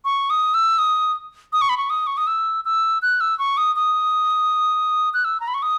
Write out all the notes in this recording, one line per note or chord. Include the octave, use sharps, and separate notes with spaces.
C#6
D#6
E6
D#6
D#6
C#6
B5
C#6
D#6
C#6
D#6
E6
E6
F#6
E6
C#6
D#6
D#6
F#6
E6
A#5
B5
C#6
D#6